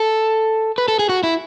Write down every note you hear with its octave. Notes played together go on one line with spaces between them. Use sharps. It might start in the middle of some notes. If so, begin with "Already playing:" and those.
Already playing: A4
B4
A4
G#4
F#4
E4